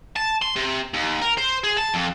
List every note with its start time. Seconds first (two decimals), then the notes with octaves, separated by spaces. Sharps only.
0.16 A5
0.42 C6
0.56 C3
0.94 D#2
1.22 A#4
1.38 C5
1.64 G#4
1.77 A5
1.94 F2